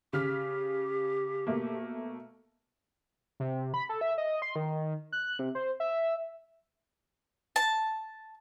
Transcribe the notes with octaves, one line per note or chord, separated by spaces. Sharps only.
C#3 G4 F6 B6
B2 A3 A#3
C3
B5
A4
E5
D#5
C6
D#3
F#6
C3
C5
E5
A5